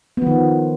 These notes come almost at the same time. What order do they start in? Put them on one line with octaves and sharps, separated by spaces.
B3 F3 D#3